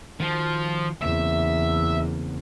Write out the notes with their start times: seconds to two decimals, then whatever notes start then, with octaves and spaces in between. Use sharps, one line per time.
0.20 D#3 F3 F#4
1.02 E2 C#3 A#3 C4 E5